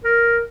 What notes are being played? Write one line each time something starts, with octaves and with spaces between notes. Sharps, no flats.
A#4